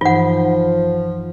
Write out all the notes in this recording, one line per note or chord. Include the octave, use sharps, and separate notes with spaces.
G2 E3 F3 D#4 F4 F#5